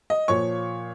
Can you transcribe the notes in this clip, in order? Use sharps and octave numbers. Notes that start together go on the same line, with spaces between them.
D#5
A#2 F3 C#5 C#6